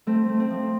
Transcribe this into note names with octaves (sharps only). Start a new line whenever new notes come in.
A3 C4
A3
C4
F3